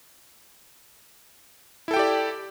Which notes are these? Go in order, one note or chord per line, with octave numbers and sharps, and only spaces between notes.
E4 G4 A4 D5 G5